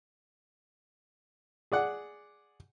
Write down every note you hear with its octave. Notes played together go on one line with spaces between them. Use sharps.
G#4 D5 F#5